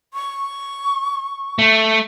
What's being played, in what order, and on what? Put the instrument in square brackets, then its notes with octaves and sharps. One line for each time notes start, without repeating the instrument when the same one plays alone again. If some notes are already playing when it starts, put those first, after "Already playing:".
[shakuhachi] C#6
[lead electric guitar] A3